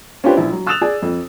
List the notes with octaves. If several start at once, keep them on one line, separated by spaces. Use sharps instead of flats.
C#4 D4 F4 G4 B4 C5
A#1 E4
F#3
D#6 E6 F#6 A6 E7 F7
G#4 D5 G#5
F2